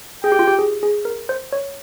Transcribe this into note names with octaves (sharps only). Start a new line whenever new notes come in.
G#4 G5
G4
F4
G4
G#4
G#4
A#4
C5
C#5